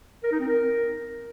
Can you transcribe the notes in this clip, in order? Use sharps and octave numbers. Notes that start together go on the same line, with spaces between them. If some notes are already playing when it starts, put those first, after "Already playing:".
A#4
D#4
C4
A#4